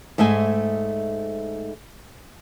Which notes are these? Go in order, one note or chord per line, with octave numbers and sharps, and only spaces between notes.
G#2 A3 D#5 E5 G#5